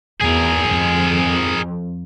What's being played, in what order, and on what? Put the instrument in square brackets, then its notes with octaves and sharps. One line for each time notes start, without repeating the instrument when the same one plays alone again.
[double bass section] E2 [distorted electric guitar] G#4 A#4
[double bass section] F2